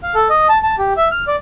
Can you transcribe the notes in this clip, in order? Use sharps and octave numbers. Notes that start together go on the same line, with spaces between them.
F5
A4
D#5
A5
A5
G4
E5
F6
D5